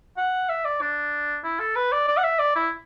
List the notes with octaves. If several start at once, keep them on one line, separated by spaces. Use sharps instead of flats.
F#5
E5
D5
D4
E4
A4
B4
D5
D5
F#5
E5
D5
E4